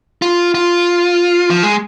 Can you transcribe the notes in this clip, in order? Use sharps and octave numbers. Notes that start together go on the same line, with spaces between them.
F4
F4
F3
G#3